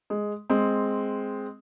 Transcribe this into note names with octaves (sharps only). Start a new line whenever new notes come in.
G#3
G#3 C4